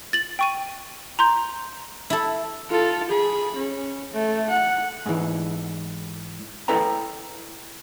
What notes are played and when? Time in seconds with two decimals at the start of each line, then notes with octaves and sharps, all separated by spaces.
0.13 A6 F#7
0.39 G5 C#6 D#7
1.19 A#5 C6 G6
2.10 E4 A4
2.70 F4 A4
3.09 G#4 B5
3.56 C#4
4.13 A3
4.49 F#5
5.06 G#2 E3
6.68 E4 A4 B4 G5 A#5